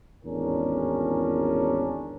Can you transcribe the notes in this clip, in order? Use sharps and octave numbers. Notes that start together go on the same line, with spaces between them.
G#1 E2 A2 C#4 D4 A#4